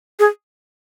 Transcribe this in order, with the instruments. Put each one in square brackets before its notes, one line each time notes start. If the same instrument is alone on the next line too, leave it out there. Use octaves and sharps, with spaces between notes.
[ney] G#4